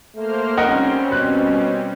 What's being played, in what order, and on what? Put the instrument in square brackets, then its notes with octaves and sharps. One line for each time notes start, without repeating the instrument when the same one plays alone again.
[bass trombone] A3 [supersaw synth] A#3 C5 F6
[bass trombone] F1 [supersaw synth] G3 C4 C#4 [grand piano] A#4 D#5 F#5
[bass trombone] B2 [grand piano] F#6